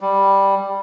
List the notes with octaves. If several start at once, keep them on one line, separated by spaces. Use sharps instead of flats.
G3